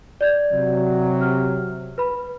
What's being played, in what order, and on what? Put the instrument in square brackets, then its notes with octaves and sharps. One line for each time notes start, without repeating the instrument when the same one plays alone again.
[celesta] D5 G6 G#6
[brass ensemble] C3 F#3
[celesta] F6
B4 B5